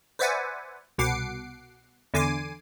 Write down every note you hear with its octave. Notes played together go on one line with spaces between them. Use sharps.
B4 C5 D5 E5 F#5 G#5
C2 B2 F#5 D6 C7 D7
E2 D3 G#5 D6 C7 D#7